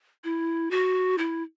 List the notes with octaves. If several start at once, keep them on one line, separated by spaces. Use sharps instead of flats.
E4
F#4
E4